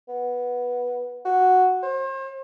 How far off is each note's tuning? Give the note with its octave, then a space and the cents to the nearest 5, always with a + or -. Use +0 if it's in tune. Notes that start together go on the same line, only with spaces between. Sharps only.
B3 -10
F#4 -5
C5 +40